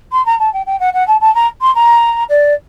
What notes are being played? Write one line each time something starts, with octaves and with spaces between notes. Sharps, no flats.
C6
A#5
A5
G5
G5
F#5
F#5
A5
A5
A#5
C6
A#5
D5